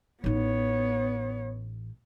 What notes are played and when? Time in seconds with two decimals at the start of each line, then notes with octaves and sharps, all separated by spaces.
0.24 A1 B3 D#4 C#5